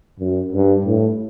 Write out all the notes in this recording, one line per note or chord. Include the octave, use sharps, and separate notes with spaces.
F#2
G2
A2